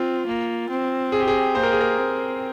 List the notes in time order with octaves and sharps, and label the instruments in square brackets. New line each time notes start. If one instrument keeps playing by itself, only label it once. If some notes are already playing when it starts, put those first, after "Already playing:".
Already playing: [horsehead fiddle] C4 [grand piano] F4
[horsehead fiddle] A#3
C4
[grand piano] G#4
G4
G#4
[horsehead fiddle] A#3 [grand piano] C5
[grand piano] A#4
G#4
A#4
[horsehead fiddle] C4